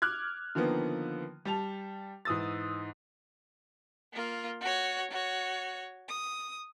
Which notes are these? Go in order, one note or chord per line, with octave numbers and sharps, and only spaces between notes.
D6 F6 F#6 G#6
D3 D#3 F3 A#3 B3
G3 A5 F7
G#2 E3 D#6 E6 A6
A#3 F4
F#4 C#5
F#4 C#5
D#6